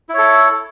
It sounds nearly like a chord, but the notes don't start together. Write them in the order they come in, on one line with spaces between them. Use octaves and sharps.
E4 C#5 A4